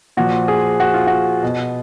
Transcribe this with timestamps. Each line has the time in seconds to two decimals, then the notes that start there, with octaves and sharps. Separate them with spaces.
0.17 A#2 F3 F#4
0.48 G#4
0.80 F#4
0.94 F4
1.07 F#4
1.43 B2